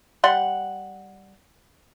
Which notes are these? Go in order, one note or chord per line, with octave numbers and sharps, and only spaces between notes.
G3 F#5 C6